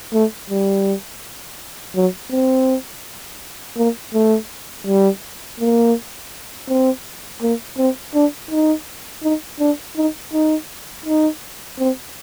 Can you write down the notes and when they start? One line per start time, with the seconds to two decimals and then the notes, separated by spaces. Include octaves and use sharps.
0.14 A3
0.50 G3
1.96 F#3
2.32 C4
3.77 A#3
4.14 A3
4.87 G3
5.60 A#3
6.69 C4
7.42 A#3
7.78 C4
8.15 D4
8.51 D#4
9.23 D#4
9.60 D4
9.97 D#4
10.33 D#4
11.06 D#4
11.79 C4